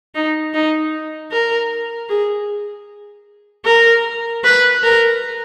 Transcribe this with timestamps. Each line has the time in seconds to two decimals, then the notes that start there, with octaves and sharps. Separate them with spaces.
0.15 D#4
0.54 D#4
1.32 A#4
2.09 G#4
3.65 A#4
4.44 B4
4.83 A#4